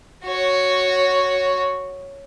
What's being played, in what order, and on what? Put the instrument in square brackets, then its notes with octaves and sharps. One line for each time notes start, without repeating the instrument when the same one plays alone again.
[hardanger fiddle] F#4 C#5